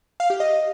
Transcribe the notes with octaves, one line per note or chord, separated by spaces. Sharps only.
F5
G4
D#5